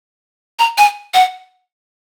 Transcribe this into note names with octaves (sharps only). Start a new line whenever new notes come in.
A#5
G#5
F#5